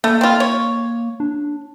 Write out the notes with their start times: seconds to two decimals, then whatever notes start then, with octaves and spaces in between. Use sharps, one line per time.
0.04 A3 A#3
0.21 C4 F4
0.40 C#5
1.20 D4